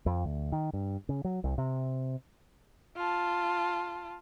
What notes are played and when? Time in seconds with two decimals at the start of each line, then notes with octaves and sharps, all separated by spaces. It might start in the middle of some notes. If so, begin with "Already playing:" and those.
0.06 F2
0.25 D2
0.52 D#3
0.73 G2
1.09 C#3
1.24 F#3
1.44 C2
1.58 C3
2.96 F4 A5